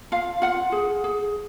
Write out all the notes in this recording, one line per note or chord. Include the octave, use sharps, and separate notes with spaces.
F4 F5
F4 F#5
G#4
G#4